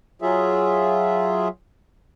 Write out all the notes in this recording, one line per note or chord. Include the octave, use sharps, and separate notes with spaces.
F#3 F4 G#4 E5